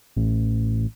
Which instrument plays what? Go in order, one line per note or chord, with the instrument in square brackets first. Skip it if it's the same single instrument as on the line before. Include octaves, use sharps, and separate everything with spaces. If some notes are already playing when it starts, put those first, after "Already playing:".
[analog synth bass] A1